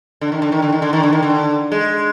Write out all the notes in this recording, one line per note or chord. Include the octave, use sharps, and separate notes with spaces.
D3
D#3
D3
D#3
D3
D#3
D3
D#3
D3
D#3
D3
G#3